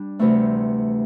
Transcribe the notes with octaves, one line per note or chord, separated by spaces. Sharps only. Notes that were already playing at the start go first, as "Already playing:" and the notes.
Already playing: G3 D4
D2 C3 E3 A3 C4